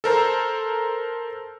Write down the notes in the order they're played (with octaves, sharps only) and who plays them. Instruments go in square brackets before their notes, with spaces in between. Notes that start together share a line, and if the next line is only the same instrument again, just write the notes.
[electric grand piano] A4 A#4 C5 A#5